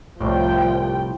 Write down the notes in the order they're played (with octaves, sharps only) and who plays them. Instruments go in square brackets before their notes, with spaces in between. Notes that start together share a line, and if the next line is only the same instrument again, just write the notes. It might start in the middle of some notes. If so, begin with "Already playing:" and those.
[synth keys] C2 A2 [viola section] F3 G5